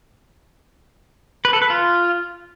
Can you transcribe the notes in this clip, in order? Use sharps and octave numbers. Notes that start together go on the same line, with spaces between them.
B4
A4
B4
F4